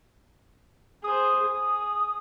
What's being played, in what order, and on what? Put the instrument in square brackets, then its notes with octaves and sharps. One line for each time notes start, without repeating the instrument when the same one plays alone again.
[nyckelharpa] G#4 C5 [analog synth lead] D#6
[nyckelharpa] G#4